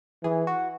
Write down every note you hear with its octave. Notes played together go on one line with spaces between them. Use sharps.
E3 G#4
F#4